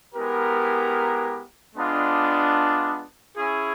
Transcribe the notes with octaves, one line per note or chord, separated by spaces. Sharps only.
G#3 B3 E4 G4 A#4
G#3 B3 D4 F4
C#4 E4 G#4